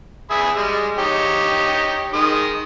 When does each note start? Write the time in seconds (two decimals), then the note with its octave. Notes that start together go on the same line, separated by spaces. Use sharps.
0.31 G#4 E5 B5
0.56 G3 G#3
0.98 D#4 G4 C#5
2.13 D#3 G#3 D#6